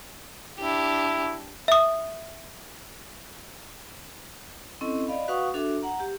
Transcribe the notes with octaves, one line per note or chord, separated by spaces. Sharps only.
D4 E4 G4
E5 D#6
C4 C#4 E4 A4 D#5
D5 D#5 F5 B5
F#4 B4 F5 F#5 C#6 D#6
D4 F#4 A4 E5 D6
F#5 A#5
G4